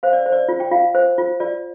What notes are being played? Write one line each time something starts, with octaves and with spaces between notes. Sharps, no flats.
C5 F5
D5
C5
D5
F4
G5
F4 F5
C5
F4
F4 D5